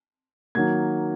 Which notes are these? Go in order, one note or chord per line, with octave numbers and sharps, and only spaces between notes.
D#3 F#3 A#3 G#6